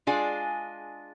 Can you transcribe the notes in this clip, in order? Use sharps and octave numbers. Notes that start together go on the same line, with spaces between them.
G#3 D4 F4 G#4